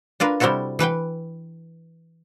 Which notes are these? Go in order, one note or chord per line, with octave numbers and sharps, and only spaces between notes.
D4 F4 A#4 B4
C3 G3 C4 E4 F#4 A4
E3 B4 F#5 G5